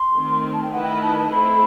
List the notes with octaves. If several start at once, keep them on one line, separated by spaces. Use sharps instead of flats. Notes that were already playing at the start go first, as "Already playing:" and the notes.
Already playing: C6
D#3 A3 C4
A5
G5
D#3 A3 E4 B4 D#5 F#5
G5
B5
A5
A5
A3 C4 E4 A4 B5